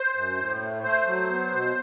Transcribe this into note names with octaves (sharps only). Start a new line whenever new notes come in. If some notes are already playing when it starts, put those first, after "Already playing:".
Already playing: C5
F#2
A2
A3
A3 C5
F#3
B3
B2